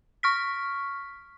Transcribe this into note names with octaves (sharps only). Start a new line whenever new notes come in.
C#6 F6 B6